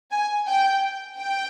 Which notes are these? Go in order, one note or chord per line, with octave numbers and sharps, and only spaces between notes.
G#5
G5
G5